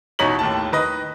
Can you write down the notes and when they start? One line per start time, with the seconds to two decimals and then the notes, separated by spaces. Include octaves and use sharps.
0.19 A1 B2 D#4 C#5 B6 F#7
0.39 D#2 A2 A5
0.72 D#3 B4 D#5